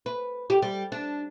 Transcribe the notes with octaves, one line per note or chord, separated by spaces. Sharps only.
B4
G4
G3
D4